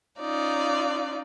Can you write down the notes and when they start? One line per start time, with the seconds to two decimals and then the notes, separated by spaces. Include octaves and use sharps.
0.19 C#4 D#4 F4 D5